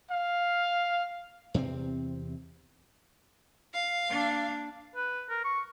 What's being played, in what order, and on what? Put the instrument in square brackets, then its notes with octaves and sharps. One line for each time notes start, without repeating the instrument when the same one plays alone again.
[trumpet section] F5
[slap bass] E2 C3 A#3 C4
[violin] F5
[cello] A#3 D4
[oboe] B4
A#4
C#6